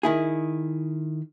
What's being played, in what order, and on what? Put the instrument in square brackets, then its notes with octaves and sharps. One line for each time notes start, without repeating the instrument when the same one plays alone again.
[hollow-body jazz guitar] D#3 E4 G#4